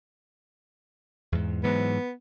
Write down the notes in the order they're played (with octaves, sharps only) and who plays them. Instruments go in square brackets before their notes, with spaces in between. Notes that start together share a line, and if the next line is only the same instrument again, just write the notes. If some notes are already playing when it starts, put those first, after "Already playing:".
[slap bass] E2 G#2
[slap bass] G#2 E3 F#3 [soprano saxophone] B3